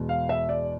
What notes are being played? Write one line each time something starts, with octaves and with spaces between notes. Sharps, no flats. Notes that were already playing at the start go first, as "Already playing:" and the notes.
Already playing: E2 B2 G#3
F5
E5
D5